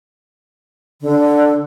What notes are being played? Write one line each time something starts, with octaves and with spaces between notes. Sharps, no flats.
D3